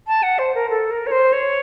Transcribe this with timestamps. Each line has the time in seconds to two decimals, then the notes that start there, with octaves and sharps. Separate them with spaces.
0.07 A5
0.23 F#5
0.39 C5
0.55 A#4
0.70 A4
0.91 A#4
1.07 C#5
1.11 C5
1.33 C#5